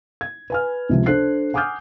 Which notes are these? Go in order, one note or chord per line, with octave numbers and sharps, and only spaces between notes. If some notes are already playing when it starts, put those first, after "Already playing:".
G#6
B4 G#5 F6
C#2 C3 F3
D4 A4 C5 F#6 C7
F#5 G#5 D6 D#6 F6 G6